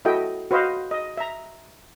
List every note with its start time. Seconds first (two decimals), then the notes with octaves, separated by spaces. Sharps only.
0.05 E4 F#4 A4 D#5 E5 G5
0.51 F#4 B4 C5 D#5 F5
0.91 D#5
1.17 E5 A#5